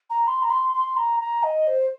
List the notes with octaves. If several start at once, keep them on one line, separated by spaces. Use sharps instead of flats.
A#5
C6
A#5
C6
C6
A#5
A#5
D#5
C5